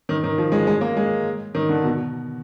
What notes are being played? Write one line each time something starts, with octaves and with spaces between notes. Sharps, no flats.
D#3
D#3
F3
G#3
G#3
A#3
G#3
D#3
D3
B2